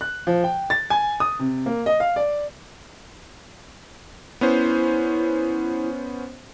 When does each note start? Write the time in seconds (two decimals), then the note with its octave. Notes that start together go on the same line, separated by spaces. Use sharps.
0.01 F#6
0.27 F3
0.44 G5
0.70 A6
0.90 G#5
1.20 D#6
1.39 C3
1.66 A#3
1.86 D#5
2.00 F5
2.16 D5
4.41 B3 C#4 E4 C5